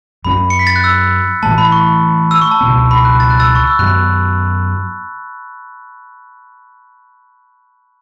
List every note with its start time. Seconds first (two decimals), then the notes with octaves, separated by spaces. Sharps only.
0.25 F#2 F#3 C#4 B5
0.50 C#7
0.59 B6
0.67 A6
0.76 F#6
0.84 E6
1.43 A2 E3 A3 A5
1.58 B5
1.72 C#6
2.31 E6
2.41 C#6
2.51 A5
2.61 C#2 B2 B3
2.91 B5
3.05 F#6
3.20 A6
3.30 F#6
3.40 E6 A6
3.55 C#6
3.67 E6
3.79 F#2 F#3 B3 F#6